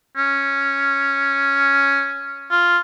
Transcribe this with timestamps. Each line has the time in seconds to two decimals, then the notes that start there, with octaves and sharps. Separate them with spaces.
0.17 C#4
2.51 F4